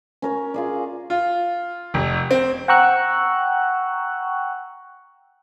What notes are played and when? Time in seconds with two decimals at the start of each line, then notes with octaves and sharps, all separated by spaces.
0.22 C#4 A#4 C#5
0.54 F4 G#4 D5
1.10 F4
1.94 F1
2.31 C4
2.68 F#5 G5 A#5 C#6 E6 F#6